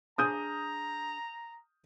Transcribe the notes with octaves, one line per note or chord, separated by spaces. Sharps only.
D4 G#4 A#5 D#6 G6 D#7